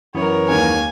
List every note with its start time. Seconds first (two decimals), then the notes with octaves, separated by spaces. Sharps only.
0.15 F#2 E3 B3 A#4 C#5
0.49 D#2 D#3 G#3 G#5